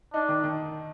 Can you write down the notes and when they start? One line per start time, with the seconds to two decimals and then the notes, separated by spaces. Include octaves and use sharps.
0.14 D4 D#4
0.29 D#3
0.44 D#3